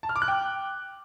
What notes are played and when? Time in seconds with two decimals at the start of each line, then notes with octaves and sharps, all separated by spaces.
0.03 A5
0.09 F6
0.16 D6
0.22 F#6
0.28 G5